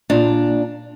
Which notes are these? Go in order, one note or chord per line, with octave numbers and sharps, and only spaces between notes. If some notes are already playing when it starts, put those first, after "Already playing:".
A#2 D4 A#5